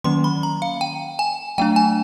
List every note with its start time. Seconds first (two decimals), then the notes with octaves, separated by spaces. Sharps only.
0.04 D#3 F#3 A#3 C#4 C6
0.24 B5
0.43 A#5
0.62 F5
0.81 G5
1.19 G#5
1.58 F#3 A3 D4 G5
1.76 G#5